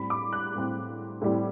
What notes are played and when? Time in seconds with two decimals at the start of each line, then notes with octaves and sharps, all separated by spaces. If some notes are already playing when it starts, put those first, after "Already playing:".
Already playing: A2 G3 C4 B5
0.10 D6
0.33 F#6
0.55 A2 G3 C4
1.22 A2 G3 C4